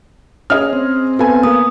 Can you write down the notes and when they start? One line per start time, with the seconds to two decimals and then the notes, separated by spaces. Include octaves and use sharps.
0.50 C#4 G#4 D#5 F6
0.73 C4
1.19 B3 A4 B4 G#5
1.44 A#3 D#6